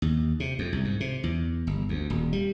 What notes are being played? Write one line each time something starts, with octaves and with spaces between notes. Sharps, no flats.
D#2
C3
F2
C2
G#2
C3
E2
G1
D2
D#1
G3